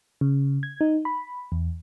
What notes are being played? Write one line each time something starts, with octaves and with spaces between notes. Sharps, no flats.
C#3
G#6
D#4
B5
E2